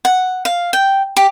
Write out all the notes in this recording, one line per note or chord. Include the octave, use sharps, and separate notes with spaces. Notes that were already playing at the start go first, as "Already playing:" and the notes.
F#5
F5
G5
G4